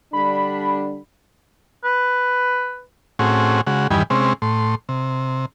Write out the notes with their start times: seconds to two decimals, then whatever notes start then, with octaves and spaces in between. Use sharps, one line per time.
0.13 D3 G3 D4 B5
1.84 B4
3.19 A2 C4 C#4 F#4 G#4
3.67 C#3 G#3 F#4
3.90 E2 G2 D#3 G3 G#5 B5
4.10 C3 G#3 C4 C#4
4.42 A2 C6
4.89 C3